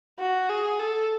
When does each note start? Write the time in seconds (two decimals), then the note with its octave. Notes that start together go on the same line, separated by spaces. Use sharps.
0.19 F#4
0.49 G#4
0.79 A4